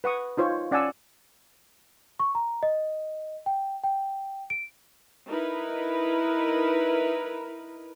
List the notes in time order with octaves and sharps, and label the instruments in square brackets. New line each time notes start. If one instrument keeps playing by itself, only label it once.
[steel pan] B4 F#5 C#6 D#6
D#4 F4 C5 C#5
C#4 D5 F#5 G#5 A5 E6
[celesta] C#6
A#5
D#5
G5
G5
D7
[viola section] D#4 E4 A#4 B4